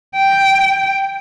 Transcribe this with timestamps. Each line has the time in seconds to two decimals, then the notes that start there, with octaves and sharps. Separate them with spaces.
0.17 G5